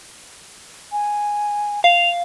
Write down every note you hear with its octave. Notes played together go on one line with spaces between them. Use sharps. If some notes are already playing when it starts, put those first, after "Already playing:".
G#5
F5 F7